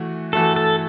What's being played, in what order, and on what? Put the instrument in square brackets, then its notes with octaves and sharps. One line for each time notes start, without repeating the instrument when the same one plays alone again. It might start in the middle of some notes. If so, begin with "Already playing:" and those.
Already playing: [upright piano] E3 A3 F#4
[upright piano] E3 A3 F#4 [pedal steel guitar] A4
[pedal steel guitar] A4